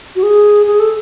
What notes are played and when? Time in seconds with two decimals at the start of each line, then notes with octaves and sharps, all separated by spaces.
0.16 F#4
0.23 G#4
0.66 G#4
0.80 A4